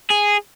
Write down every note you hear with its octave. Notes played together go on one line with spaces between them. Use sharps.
G#4